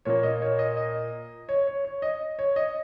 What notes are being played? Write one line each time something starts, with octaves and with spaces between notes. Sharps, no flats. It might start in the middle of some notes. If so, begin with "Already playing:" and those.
A#2 A#3 C#5
D#5
C#5
D#5
D#5
C#5
C#5
C#5
D#5
C#5
D#5